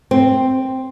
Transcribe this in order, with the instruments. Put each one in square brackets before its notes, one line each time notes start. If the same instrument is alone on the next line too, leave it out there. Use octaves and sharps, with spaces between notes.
[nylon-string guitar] C4